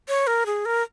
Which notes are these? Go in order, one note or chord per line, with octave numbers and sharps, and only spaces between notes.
C#5
A#4
G#4
A#4